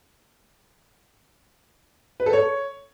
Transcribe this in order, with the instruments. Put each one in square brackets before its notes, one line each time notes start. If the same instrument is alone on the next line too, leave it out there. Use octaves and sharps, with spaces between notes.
[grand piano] B4
A4
C#5